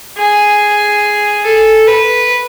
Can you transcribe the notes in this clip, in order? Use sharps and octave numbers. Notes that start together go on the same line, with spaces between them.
G#4
A4
B4